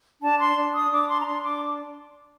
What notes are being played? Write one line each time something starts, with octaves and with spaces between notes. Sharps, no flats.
D4 A5
C6
D4
D#6
D4 D6
C6
A#5
D4 C6
D6